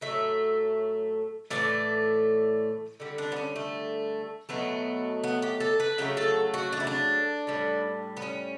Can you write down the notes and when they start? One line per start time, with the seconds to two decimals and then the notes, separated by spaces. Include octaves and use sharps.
0.01 A2 F#3 A3 E5
1.50 A2 E3 A3 D5
3.00 D3 G3
3.18 D4
3.32 B3
3.37 C#4
3.56 A3
4.49 B2 F#3 A3 B3
5.24 B3
5.42 G4
5.60 A4
5.80 B4
5.98 C#3 F#3 A3 G4
6.17 A4
6.54 F#4
6.73 D4
6.80 E4
6.87 D4
7.47 A2 G3
8.17 B3
8.22 C#4